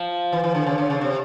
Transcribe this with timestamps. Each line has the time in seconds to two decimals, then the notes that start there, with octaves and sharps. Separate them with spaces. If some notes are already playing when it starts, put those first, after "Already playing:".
Already playing: F3
0.33 E3
0.44 E3
0.55 D3
0.67 C#3
0.78 D3
0.90 C#3
1.01 C3